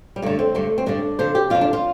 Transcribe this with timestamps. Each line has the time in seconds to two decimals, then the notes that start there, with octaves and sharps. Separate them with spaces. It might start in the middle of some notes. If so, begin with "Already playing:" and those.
0.16 G3
0.22 G2 D3 A3
0.39 C4
0.55 G2 D3 A3
0.78 C4
0.86 G2 D3 D4
1.19 F2 D3 C5
1.35 G4
1.50 F2 D3 F4
1.61 D4
1.73 F4